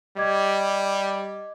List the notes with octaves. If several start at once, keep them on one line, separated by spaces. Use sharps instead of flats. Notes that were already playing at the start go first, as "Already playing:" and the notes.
G3 D#5 D6 G#6